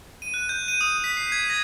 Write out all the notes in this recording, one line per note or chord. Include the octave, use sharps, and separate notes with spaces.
D#7
F#6
G6
D#7
D#6
B6
C7
G#6
A#6